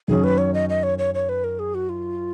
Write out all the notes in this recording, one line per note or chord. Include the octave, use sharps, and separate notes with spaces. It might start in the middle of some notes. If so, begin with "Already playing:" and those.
F#2 D#3 F#3 C#4 G#4
B4
C#5
D#5
D#5
C#5
C#5
C#5
B4
A#4
G#4
F#4
F4